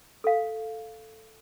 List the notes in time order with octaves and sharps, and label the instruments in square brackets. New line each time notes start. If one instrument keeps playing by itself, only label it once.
[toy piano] A4 F5